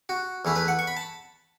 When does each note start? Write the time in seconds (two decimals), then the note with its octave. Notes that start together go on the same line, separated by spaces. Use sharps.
0.09 F#4
0.45 E2 E3 A3 E4
0.56 B4
0.68 F#5
0.79 C#6
0.87 B5
0.97 A5